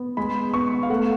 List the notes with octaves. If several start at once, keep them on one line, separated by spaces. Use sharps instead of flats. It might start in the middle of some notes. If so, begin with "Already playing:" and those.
Already playing: B3
G#3 B5
B3 C#6
F5
A3 F#5